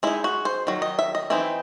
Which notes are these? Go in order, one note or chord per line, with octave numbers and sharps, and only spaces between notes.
G#3 D#4 E4
F#4
C5
D#3 F#3
D#5
E5
D#5
E3 C4 D#4 E4